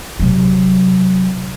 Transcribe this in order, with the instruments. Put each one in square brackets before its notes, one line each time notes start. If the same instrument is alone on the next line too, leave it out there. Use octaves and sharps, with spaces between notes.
[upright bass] C3 F#3